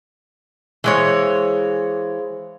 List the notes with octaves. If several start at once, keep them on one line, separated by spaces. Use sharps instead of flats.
E3 G#3 G#4 C5 C#5 F5